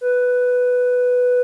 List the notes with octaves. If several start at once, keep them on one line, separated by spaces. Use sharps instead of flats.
B4